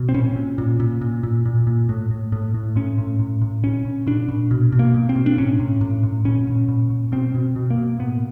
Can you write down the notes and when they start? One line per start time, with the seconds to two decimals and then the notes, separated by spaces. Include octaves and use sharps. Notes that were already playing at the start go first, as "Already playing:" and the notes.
Already playing: B2
0.09 C4
0.14 A#2 C#4
0.36 A#2
0.58 A#2
0.80 A#2
1.01 A#2
1.23 A#2
1.45 A#2
1.67 A#2
1.89 A2
2.11 A2
2.32 A2
2.54 A2
2.76 A2 C#4
2.98 A2
3.19 A2
3.41 A2
3.63 A#2 C#4
3.85 A#2
4.07 A#2 D4
4.28 A#2
4.51 B2
4.72 B2
4.79 A#3
4.94 B2
5.09 C4
5.16 B2
5.26 D4
5.38 A2 C#4
5.60 A2
5.81 A2
6.03 A2
6.25 A#2 C#4
6.47 A#2
6.69 A#2
6.90 A#2
7.12 B2 C4
7.35 B2
7.56 B2
7.70 A#3
7.78 B2
7.99 A2 B3